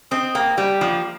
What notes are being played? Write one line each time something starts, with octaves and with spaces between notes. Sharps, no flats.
C4 D#5
A#3 G5
G3 G4
F3 A#3